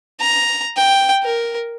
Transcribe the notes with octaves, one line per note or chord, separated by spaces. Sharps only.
A#5
G5
A#4